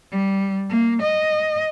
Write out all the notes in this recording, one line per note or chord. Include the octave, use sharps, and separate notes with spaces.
G3
A#3
D#5